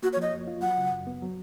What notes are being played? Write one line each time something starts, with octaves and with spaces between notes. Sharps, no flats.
A#3 F#4
C#5
F3 D#5
F2
F4
F#3 F#5
C#3
F#2
B3
F#3